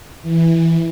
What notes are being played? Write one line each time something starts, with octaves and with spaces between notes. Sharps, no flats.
E3